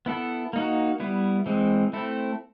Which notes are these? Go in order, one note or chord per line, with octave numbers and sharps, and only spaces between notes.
B3 E4 A4
A#3 D#4 F#4
G3 B3 E4
E3 G#3 C4
A3 C4 E4 A4